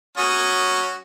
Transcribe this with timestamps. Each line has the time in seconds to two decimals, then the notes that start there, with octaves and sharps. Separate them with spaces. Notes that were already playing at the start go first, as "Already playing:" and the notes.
0.17 F#3 C#4 F#4 D#6